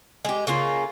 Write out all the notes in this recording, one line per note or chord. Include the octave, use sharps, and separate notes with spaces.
G#3 G4
C#3 A#3 F4